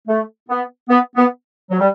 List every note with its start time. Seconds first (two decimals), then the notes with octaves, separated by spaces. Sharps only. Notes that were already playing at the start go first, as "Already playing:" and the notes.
0.07 A3
0.49 B3
0.89 B3
1.16 B3
1.71 F#3
1.80 G3